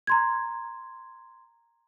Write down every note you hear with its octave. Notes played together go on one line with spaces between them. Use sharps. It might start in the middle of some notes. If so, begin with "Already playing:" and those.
A#5 C6 G#6